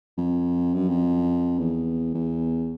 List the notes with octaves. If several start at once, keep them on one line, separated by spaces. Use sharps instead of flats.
F2
F#2
F2
E2
E2